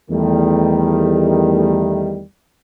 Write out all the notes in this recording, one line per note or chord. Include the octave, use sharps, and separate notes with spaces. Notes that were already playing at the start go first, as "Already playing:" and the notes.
E2 D#3 G3 A3